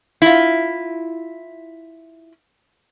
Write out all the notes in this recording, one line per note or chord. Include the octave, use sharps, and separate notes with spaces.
E4 F4